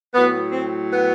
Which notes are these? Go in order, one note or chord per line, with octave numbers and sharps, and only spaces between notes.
A2 F#3 B3
C4
B3